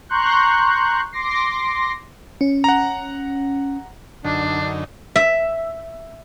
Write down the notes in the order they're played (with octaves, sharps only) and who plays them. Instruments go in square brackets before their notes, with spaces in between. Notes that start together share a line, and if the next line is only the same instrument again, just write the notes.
[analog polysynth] A#5 C6 C#6 F#6 G6
C6 D6 A#6 C7
[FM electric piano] C#4
[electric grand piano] F#5 A#5
[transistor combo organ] F#2 D3 D#4 [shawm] D4
[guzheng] E5